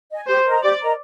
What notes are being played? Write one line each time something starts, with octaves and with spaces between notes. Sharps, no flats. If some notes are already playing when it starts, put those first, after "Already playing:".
D#5 G#5
G4 C5
A#4 D#5 A#5
G4 D5
A#4 D#5 A#5